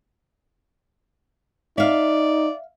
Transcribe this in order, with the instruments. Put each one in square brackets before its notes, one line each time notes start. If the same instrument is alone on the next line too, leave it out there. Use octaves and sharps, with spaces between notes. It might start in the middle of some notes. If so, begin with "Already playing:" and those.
[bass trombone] D#4 [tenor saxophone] D5 [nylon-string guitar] E5 F5